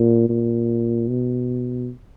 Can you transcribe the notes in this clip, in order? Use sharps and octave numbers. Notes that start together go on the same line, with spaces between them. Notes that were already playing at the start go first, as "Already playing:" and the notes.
Already playing: A#2
A#2
B2